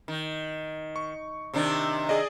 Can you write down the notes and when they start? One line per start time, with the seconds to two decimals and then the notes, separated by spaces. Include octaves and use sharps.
0.08 D#3
0.96 C#6
1.54 C3 D#3 D4
2.09 G#4 D5 D#5